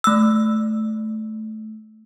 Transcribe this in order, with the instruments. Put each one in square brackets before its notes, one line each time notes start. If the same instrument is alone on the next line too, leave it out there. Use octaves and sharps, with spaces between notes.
[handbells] A3 E6